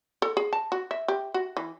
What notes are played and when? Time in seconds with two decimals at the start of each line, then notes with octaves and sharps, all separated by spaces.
0.22 A4
0.37 G#4
0.53 A5
0.72 F#4
0.91 E5
1.08 G4
1.34 F#4
1.57 E3